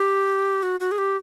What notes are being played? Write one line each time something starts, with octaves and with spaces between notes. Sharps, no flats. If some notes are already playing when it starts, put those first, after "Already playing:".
Already playing: G4
F#4
F#4
G#4
G4